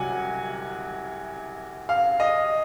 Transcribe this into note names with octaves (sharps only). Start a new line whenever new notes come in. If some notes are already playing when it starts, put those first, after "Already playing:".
Already playing: C2 C3 F#3 F#5 G#5
F5
D#5